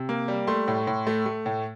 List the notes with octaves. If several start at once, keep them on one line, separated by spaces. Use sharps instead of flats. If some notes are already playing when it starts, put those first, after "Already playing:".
Already playing: C3
A#3
G3
A3 C6
A2
A2
A3
A3
A2